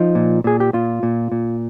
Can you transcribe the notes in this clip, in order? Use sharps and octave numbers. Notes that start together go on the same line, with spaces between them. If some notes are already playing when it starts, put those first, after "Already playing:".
Already playing: F3 D#4
A#2
A#2 G#4
G4
A#2 F4
A#2
A#2